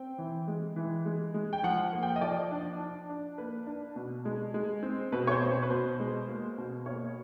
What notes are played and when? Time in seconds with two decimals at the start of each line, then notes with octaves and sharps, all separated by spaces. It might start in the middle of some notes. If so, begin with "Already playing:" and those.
Already playing: C4 G5
0.18 E3
0.48 G#3
0.76 E3
1.06 G#3
1.34 G#3
1.53 G5
1.63 F3 F#5
1.93 A#3
2.03 G5
2.16 D#5
2.21 F3 D5
2.51 D4
2.80 D4
3.09 D4
3.38 A#3 B4
3.67 D4
3.96 B2
4.25 G#3
4.54 G#3
4.83 C4
5.12 B2 B4
5.27 C#5
5.32 C5
5.42 B2
5.51 C5
5.62 B4
5.70 B2 C5
6.00 G#3
6.29 A#3
6.58 B2
6.86 A#3 C#5